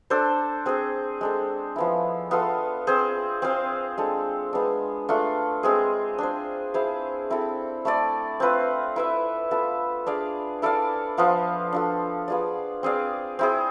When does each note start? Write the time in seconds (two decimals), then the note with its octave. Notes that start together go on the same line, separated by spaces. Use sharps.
0.10 D4 A4 C5
0.66 C4 G#4 C5
1.21 G#3 D4 A4
1.76 F3 B3 E4
2.31 B3 F4 A4
2.87 C4 G#4 C5
3.42 C4 G#4 C5 F5
3.98 G#3 D4 A4
4.53 G#3 B3 D4
5.09 A3 D4 F4 A4
5.63 G#3 C4 G#4
6.18 D4 G#4 C5
6.74 E4 G#4 C5 F5
7.30 C4 E4 A4
7.85 A3 E4 A4 D5
8.40 C4 F4 B4
8.96 E4 B4 E5
9.51 B3 F4 A4 E5
10.06 D4 G#4 D5 F5
10.62 E4 A4 D5 F5
11.17 F3 B3 F4
11.73 D4 F4 A4
12.28 B3 F4 G#4 D5
12.83 C4 G#4 D5 F5
13.39 C4 E4 G#4